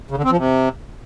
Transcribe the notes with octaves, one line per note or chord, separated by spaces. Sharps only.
C#3
D3
C4
F3
C3